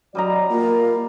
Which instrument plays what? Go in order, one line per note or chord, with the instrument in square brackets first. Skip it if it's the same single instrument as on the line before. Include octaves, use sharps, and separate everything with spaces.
[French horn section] F#3 D5 [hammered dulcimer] G3 D#5 A#5
[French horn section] A#3 [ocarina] F4